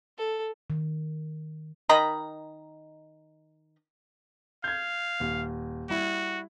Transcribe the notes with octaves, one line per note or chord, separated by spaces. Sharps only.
A4
D#3
D#3 D#5 A#5 B5
F5 G6 G#6
D#1
G3 E4 F#4